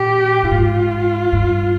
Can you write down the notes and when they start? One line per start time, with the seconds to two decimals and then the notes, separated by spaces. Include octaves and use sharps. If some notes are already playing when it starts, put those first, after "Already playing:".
Already playing: A#2 G4
0.43 G2
0.51 G#2 F4
1.32 G2